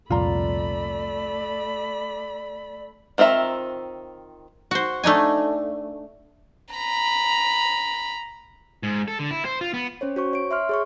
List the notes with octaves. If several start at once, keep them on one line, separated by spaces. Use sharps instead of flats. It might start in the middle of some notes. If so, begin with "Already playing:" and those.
C2 F2 A#2 A3 F4 D5 A#5 B5
D#3 C4 F4 E5 A#5
F#4 C5
A3 D4 D#4 G#5
A#5 B5
G#2
A4
D3
E4
C5
F4
B3
C#4 C5 C#5
F#4 C5 C#6
C#5 D7
E5 C6 F6
G#4 C#5 C#6